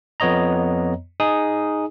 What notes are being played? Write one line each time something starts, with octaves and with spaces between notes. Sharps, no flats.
F2 B3 C#5 D#5 A#5
D#4 G#4 D#6